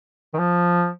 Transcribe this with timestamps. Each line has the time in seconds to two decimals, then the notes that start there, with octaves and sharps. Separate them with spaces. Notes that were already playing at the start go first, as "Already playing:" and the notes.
0.34 D#3
0.38 F3